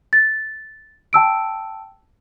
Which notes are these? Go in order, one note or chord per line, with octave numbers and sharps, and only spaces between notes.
A6
G5 A5 E6 D7